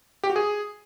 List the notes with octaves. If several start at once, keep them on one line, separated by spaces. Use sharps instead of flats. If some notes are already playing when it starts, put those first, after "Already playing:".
G4
F#4
G#4